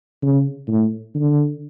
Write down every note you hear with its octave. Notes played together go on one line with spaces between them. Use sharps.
C#3
A2
D3